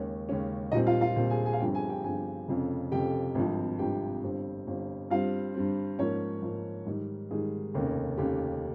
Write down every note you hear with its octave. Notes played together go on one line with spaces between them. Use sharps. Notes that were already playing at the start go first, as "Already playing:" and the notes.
Already playing: D#2 C#3 G#3 C#4 C#5
D#2 C#3 G#3 C#4
A#1 A#2 G3 C4 D#4 D#5
F4 F5
F4 F5
A#1 A#2 G3 C4
G#4 G#5
G#4 G#5
F5
G1 G2 F3 C4 G4 G5
G#4 G#5
G4 G5
G1 G2 F3 C4 G#4 G#5
F1 F2 C#3
F1 F2 C#3 G4 G5
G#1 G2 F3
G#1 G2 F3 G4 G5
G1 G2 G3 C4
G1 G2 G3 C4
G2 G3 C4 F4 F5
G2 G3 C4
G#2 F3 A#3 C#4 C#5
G#2 F3 A#3
G#2 D#3 G3
G#2 D#3 G3 G#4
F1 D#2 C#3
F1 D#2 C#3 G4